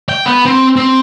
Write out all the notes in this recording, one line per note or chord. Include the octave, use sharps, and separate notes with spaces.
G5
B3
C4
C4